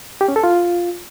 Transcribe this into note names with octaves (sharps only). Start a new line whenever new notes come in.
G4
C#4
A4
F4